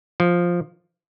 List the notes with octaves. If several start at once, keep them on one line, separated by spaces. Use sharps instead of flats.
F3